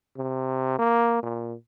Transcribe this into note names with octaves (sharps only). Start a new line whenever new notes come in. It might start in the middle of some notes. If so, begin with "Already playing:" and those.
C3
A#3
A#2